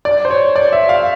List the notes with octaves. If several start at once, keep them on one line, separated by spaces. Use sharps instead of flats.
D5
C5
C#5
D5
E5
F5